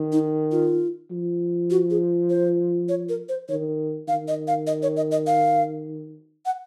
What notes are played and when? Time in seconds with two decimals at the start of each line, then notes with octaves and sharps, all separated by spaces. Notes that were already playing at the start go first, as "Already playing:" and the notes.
Already playing: D#3
0.12 D#4
0.52 F4
1.11 F3
1.71 F#4
1.91 G#4
2.30 C5
2.89 C#5
3.09 A#4
3.29 C5
3.49 D#3 C#5
4.08 D#3 F5
4.28 D#5
4.48 F5
4.67 D#5
4.83 C#5
4.97 D#5
5.12 D#5
5.27 F5
6.46 F#5